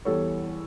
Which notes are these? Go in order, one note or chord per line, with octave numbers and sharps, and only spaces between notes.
E2 E3 G3 A4 C#5